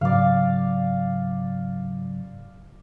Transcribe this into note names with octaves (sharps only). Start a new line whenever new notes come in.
G#2 C#3 F#3 D5 F5